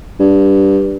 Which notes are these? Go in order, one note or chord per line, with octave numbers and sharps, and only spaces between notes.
G2